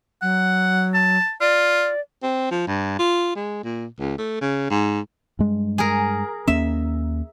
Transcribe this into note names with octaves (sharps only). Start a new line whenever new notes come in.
F#3 F#5
A5
F4 D5
C4
F3
G2
F4
G#3
A#2
C#2
A3
C#3
G#2
G2 G#3
G#4 A#4
D#2 A#3 C#4 E5